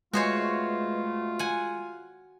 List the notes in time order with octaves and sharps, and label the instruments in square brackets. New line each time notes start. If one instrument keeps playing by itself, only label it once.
[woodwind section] B2 A3 [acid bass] G#3 [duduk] F4 [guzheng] F#4 C5 C#5
[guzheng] F#5 G#5